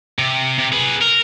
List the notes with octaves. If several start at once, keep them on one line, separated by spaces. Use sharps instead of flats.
C3
C3
G#4 B4
A#4